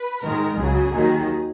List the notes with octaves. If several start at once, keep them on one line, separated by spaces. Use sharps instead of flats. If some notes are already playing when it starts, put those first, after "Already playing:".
Already playing: B4
G#2 D#3 G#3 A#4
C#2 C#3 F#3 G#4
D#2 D#3 F#3